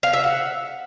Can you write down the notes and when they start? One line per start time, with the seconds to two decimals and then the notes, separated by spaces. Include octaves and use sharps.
0.03 F5
0.13 E5
0.24 F#5